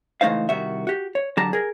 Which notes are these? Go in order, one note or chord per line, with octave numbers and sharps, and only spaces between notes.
C#2 E3 A3 D#4 C5 F5
C2 D#3 F#4 E5
F#4 G4
C#5
D3 F#3 G4 A5 A#5
G#4 A#4